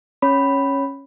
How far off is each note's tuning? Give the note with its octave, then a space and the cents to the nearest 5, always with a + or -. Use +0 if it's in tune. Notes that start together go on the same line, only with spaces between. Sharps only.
C#4 -10 C#5 +0 B5 +0